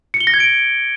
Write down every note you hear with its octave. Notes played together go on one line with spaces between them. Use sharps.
C#7
G7
A#6
G#6
D7